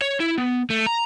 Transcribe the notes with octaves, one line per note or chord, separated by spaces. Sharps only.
C#5
E4
B3
A3
A#5